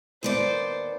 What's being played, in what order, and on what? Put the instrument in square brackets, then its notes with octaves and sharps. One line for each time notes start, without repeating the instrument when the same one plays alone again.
[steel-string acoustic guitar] D#2 B3 D5 [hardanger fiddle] C5